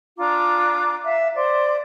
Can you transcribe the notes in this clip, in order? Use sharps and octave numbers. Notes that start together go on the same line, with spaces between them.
D4 F4 A#5 D6
E5 F5
C5 D5 C6